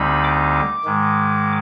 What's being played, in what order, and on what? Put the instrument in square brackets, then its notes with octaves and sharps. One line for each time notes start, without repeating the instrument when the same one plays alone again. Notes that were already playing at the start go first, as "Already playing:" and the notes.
Already playing: [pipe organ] D2 D3 G3 C4 D#4 B5
D6
G#2 D#3 G#3